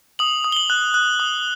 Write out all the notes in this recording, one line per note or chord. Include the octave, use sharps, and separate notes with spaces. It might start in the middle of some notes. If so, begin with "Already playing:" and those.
D#6 F#7
D#6
G7
F#7
F#6
F#6
D#6